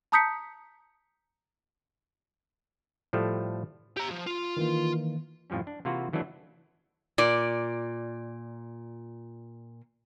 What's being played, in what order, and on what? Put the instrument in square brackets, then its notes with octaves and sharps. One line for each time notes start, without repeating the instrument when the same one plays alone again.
[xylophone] A5 A#5 D#6 G6 B6 C#7
[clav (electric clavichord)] A2 F3 G3 A3
[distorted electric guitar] G4 A#5
F3
F4
[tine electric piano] D#3 E3 A#3
[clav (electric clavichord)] F2 A2 F3 G3 C#4
D4
C3 E3 A#3 F4 F#4 B4
D#3 E3 F#3 A3 D4
[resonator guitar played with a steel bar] A#2 D5